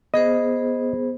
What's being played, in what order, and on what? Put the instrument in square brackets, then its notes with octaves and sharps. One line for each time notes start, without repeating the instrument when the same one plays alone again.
[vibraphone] B3 G#4 C5 [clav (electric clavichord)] D#5